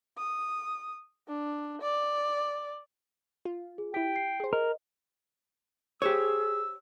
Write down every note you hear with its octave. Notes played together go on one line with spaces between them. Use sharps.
D#6
D4
D5
F4
G#4
E4 G4 G5 B6
C7
G#4 C5
A#4 D#5
G4 G#4 C5 C#5 E6